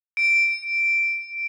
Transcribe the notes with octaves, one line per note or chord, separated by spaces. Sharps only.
D7